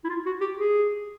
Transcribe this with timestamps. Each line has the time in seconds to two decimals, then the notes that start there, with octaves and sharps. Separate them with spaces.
0.04 E4
0.09 F4
0.26 F#4
0.40 G4
0.57 G#4